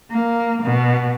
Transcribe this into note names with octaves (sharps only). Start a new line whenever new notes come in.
A#3
B2